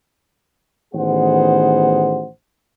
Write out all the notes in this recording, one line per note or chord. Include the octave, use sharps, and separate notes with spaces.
A1 D#3 B3 G#4 C5 F#5